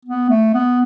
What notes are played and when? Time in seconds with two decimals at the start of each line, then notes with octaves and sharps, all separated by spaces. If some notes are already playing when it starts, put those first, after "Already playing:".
0.05 B3
0.29 A3
0.54 B3